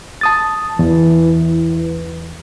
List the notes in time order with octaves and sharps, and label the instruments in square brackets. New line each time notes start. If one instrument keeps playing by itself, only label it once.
[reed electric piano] A5 D#6 A6
[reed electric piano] E2 [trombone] E3